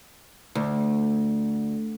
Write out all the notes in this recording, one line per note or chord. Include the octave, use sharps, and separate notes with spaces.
D2